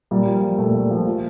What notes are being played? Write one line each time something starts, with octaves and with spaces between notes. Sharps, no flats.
A#2 G3
F3
F3
A#2 A3
A#2
F3
F3